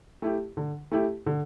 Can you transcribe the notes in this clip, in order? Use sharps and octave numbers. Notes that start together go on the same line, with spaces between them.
A3 E4 G4
D3
A3 E4 G4
D3